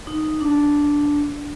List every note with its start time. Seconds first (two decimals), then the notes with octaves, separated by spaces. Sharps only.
0.07 D#4
0.41 D4